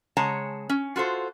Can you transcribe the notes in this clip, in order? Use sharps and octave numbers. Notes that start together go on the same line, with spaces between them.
C#3 G#3 C#5 F#5 A5 A#5
C#4
F4 F#4 A4 C5